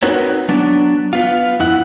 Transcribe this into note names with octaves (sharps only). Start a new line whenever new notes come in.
C4 D#4 F#4 A#4 B4 C#5
F#3 B3 D4
B3 F4
F2 E4 F#5